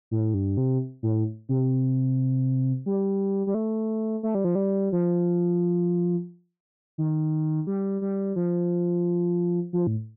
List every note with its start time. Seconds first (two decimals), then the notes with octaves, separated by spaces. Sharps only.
0.11 A2
0.34 G2
0.57 C3
1.03 A2
1.49 C3
2.86 G3
3.47 G3
3.54 A3
4.23 A3
4.35 G3
4.44 F3
4.55 G3
4.92 F3
6.98 D#3
7.67 G3
8.01 G3
8.36 F3
9.73 F3
9.87 A2